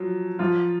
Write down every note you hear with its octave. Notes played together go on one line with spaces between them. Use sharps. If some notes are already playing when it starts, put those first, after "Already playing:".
Already playing: F3 F#3
F3 F4